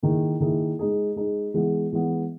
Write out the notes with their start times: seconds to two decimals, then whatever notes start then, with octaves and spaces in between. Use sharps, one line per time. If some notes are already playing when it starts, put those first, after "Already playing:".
0.02 D#3 A#3 E4 G#4
0.40 D#3 A#3 E4 G#4
0.79 G#3 D#4 G#4
1.16 G#3 D#4 G#4
1.54 E3 G#3 B3
1.92 E3 G#3 B3